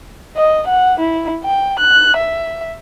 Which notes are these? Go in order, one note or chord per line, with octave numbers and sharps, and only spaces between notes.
D#5
F#5
E4
G5
F#6
E5